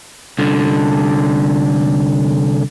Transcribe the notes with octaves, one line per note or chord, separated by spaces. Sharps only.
C2 D3